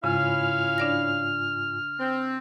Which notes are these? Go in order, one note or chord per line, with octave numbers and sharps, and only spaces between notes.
G#2 C#3 C#4 E4 F4 F5 G#5 F6
D4 D5 A#6
C4